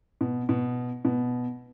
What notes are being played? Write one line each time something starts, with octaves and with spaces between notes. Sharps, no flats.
B2
B2
B2